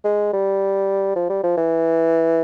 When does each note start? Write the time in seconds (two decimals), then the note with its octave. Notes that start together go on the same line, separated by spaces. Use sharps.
0.04 G#3
0.33 G3
1.16 F3
1.29 G3
1.43 F3
1.57 E3